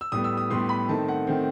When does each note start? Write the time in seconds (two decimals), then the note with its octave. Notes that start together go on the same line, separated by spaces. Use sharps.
0.01 E6
0.12 A2 G3 B3 D#6
0.24 E6
0.37 D#6
0.50 A2 G3 B3 C6
0.69 B5
0.89 D#3 A3 C4 A5
1.08 F#5
1.27 D#3 A3 C4